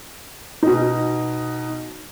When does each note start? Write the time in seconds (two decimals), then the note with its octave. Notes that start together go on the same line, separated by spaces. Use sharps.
0.63 B2 D#4